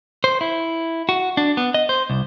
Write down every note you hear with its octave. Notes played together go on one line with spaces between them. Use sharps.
C5
E4
F#4
D4
B3
D#5
C5
C2